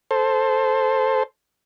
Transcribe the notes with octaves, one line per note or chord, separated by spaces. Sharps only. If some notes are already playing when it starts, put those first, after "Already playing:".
A4 C5